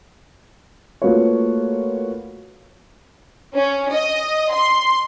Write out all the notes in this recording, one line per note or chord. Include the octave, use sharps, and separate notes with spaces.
A3 A#3 F4 F#4 B4 C#5
C#4
D#5
C6